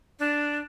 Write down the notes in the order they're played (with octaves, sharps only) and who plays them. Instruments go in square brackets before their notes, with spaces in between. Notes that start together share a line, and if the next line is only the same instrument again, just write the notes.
[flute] D4